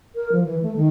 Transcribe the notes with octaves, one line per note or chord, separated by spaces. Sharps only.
A#4
F3
E3
A3
D#3